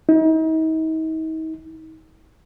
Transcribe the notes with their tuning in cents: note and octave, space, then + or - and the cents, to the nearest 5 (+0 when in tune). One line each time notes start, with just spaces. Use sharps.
D#4 +40